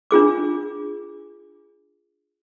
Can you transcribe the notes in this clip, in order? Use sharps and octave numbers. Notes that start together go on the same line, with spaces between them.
D4 F4 G#4 D6